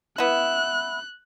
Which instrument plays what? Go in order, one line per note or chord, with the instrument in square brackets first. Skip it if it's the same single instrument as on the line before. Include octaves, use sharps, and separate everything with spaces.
[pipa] B3 E4 [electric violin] F#6